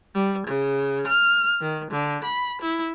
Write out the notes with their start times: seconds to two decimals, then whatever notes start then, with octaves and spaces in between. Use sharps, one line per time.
0.14 G3
0.47 C#3
1.07 F6
1.60 D#3
1.90 D3
2.24 B5
2.61 E4